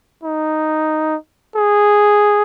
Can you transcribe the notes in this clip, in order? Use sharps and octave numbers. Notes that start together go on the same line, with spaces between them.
D#4
G#4